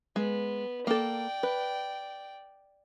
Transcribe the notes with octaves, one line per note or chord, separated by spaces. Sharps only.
G#3 B3
A#3 A4 D5 G5
B4